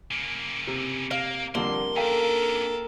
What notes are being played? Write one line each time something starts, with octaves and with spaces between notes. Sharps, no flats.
C#3 A#3
C3
A#3 F5
F2 D3 G3 A#3 C6
C#4 D4 A4 A#4 F5 G5